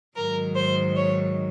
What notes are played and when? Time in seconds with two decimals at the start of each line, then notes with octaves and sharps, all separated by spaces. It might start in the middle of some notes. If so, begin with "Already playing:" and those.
0.15 G#2 D#3 F#3 A#4
0.55 C5
0.95 C#5